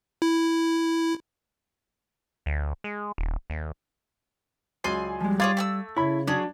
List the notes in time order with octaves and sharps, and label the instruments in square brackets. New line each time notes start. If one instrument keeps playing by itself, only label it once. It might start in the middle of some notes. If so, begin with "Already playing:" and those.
[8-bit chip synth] E4
[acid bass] D2
G#3
D#1
D#2
[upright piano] C#2 F#3 C7 [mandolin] D5 G#5 C6
[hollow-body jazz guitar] F3 G#3 [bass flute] G3
[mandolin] F4 G#4 C#5 [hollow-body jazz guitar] F5 [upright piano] D6 G#6 A6
[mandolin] A3 G#5 E6
[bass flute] C#3 [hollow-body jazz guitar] E4 [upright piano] C#5 B5
[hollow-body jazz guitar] F#3 [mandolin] C#4 G#4 [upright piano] D4